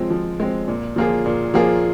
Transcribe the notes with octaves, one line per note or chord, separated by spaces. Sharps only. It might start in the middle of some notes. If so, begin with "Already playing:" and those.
Already playing: F3 G#3 C4
F3
G#3 C4
A#2
F3 A#3 F4 G#4
A#2
F3 A#3 F4 G#4